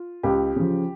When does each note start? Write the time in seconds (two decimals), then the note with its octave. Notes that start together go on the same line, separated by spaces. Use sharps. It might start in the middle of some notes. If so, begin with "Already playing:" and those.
Already playing: F4
0.23 C#2 G4
0.56 C#3 F3